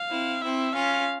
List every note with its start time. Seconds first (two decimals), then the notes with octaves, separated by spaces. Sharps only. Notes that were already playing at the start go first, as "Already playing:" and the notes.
Already playing: F5
0.11 C4 E4
0.42 C4 E4 E5
0.73 C#4 F4 F5